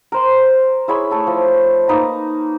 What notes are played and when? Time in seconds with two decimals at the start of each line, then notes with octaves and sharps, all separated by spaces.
0.12 A#4 C5 C6
0.88 E4 G#4 C#5 B5
1.11 A3 A4
1.27 F3
1.88 A#3 D#4 B4 A#5